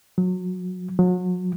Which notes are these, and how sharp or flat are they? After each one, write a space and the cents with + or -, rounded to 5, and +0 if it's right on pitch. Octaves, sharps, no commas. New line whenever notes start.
F#3 -25
F#3 -35